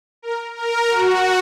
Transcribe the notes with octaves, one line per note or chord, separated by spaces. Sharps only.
A#4
A#4
F#4